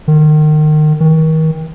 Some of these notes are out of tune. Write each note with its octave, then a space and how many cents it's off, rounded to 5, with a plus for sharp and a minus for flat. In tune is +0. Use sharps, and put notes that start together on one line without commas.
D#3 -30
D#3 +35